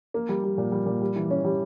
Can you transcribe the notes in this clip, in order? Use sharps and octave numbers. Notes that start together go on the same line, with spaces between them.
A#3
G3
G3
A#2
G3
A#2
G3
E3
C#4
G3